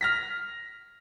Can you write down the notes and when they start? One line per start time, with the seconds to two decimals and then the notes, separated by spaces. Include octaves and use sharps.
0.01 F6 A#6 B6